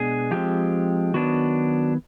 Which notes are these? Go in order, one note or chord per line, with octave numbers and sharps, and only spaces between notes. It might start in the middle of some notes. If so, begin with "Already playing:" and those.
Already playing: B2 G#3 B3 D4 G#4
F3 G#3 C4 G4
D#3 F#3 B3 D4 F#4